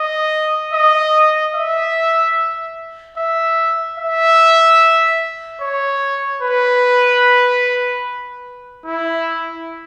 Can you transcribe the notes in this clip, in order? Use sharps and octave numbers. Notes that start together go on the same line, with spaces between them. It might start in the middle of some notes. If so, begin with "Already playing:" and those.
Already playing: D#5
D#5
E5
E5
E5
C#5
B4
E4